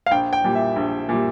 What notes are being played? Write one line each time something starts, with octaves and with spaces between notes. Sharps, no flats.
F5
A#1 G5
G5
A#2 G3
E5
A#1
A#2 G3